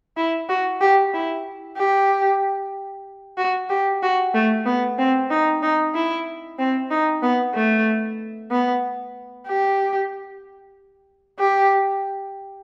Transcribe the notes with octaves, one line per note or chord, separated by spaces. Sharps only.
E4
F#4
G4
E4
G4
F#4
G4
F#4
A3
B3
C4
D#4
D#4
E4
C4
D#4
B3
A3
B3
G4
G4